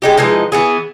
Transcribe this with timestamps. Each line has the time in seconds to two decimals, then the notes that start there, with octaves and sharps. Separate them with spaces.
0.02 G#3 D#4 G4
0.17 E3 F3 G#3 D#4
0.52 E3 B3 G#4